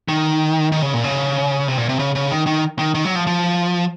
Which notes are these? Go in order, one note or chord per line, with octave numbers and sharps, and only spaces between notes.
D#3
D#3
C#3
A#2
C#3
C3
A#2
C3
C#3
C#3
D#3
D#3
D#3
D#3
F#3
F3
F3